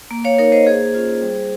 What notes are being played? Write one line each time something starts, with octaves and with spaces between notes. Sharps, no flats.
A#3
C#5 F5
D#4 A#4 C#5
C5 D#5
A#3 G#4 C5
C#4 F4
G3